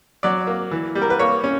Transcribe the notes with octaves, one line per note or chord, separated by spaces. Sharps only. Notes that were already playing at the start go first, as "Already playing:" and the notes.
F#3 D5
A#3
E3
G3
A#4
B4
A#3 C#5
C#4